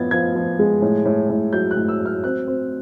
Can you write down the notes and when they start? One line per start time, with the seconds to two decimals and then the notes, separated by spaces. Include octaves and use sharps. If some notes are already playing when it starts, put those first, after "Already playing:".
Already playing: A2 F3 B3 G#6 A6
0.11 F3 G#6
0.35 F3
0.59 G#3
0.82 A2
1.05 A2
1.30 A2
1.53 F#3 G6
1.71 F#6
1.77 A2
1.88 E6
2.00 F#3
2.06 F6
2.24 C4 F#6
2.48 C4